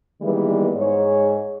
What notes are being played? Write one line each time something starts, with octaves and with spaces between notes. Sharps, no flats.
D#3 E3 G3 G#3 A#3 B3
G#2 G#3 C#5